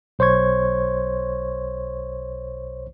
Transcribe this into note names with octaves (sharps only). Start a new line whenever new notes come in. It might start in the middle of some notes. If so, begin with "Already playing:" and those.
B1 C5 C#5 C#6 G#6